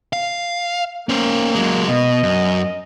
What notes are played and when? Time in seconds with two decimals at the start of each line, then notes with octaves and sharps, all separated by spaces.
0.13 F5
1.09 A#3 C#4 C5
1.55 F#3 G#3
1.89 B2 D#5
2.23 F#2